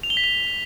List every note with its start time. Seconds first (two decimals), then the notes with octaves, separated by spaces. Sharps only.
0.03 F7
0.10 G7
0.17 B6
0.24 F7